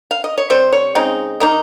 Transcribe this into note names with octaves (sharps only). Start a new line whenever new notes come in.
F5
D#5
C#5
C3 G3 C5
C#5
C#3 G#3 C4 D#4
D#3 A#3 D#4